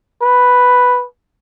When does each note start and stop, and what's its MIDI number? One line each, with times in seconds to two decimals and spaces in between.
0.22 1.06 71